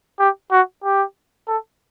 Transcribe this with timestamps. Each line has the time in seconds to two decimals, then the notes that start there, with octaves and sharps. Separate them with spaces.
0.19 G4
0.51 F#4
0.84 G4
1.47 A4